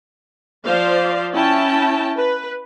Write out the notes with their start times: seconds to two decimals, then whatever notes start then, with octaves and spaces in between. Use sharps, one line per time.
0.65 F3 C5 D5 F5
1.34 C#4 E4 G5 A5
2.18 B4